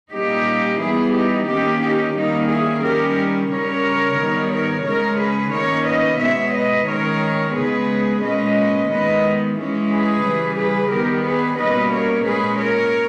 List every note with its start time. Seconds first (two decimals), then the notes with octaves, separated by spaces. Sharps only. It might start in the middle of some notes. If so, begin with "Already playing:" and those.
0.12 A#2 G3 A#3 C#4 D#4 G4
0.79 E3 G3 B3 E4 G#4
1.13 D#4 G4
1.48 D#3 A#3 C#4 D#4 G4
1.82 D#4 G4
2.15 D#3 G3 A#3 C#4 D#4
2.48 E4 G#4
2.82 D#3 G3 C#4 G4 A#4
3.49 C#3 G3 C#4 A#4 C#5
4.17 D#3 G3 B3
4.50 A#4 C#5
4.84 C#3 G#3 C#4 A#4 C#5
5.18 G#4 B4
5.52 D#3 A#3 C#4 A#4 C#5
5.86 B4 D#5
6.19 B2 G#3 B3 C#5 E5
6.53 B4 D#5
6.86 D#3 G#3 C#4 A#4 C#5
7.54 C#3 G#3 B3 G#4 B4
8.21 A#2 G#3 C#4 B4 D#5
8.88 D#3 G#3 B3 B4 D#5
9.56 E3 G#3 C#4
9.89 G#4 B4
10.23 C#3 E3 G3
10.57 G#4 B4
10.90 D#3 G3 B3 G4 A#4
11.24 G#4 B4
11.58 B2 G3 A#3 C#4 B4 D#5
11.92 A#4 C#5
12.26 A#2 G#3 C#4 G#4 B4
12.59 A#4 C#5